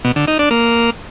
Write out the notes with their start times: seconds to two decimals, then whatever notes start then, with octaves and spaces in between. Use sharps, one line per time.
0.05 B2
0.16 D3
0.28 D#4
0.39 D4
0.51 A#3